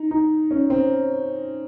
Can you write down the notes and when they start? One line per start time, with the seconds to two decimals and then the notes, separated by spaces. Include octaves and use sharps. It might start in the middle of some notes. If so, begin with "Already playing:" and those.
Already playing: D#4
0.11 D#4
0.51 C#4
0.70 C4